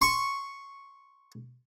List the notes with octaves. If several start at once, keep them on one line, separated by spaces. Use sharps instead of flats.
C6 C#6